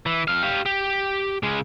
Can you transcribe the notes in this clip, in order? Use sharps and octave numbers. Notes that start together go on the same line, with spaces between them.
E3
F2 F5
G4 F5
G4
C#3 G#3